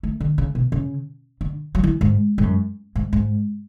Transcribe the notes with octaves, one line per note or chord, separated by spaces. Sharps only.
A3
D3
C#3
B2
C#3
D3
F#3
E3
G#2
G#2
F#2
G#2
G#2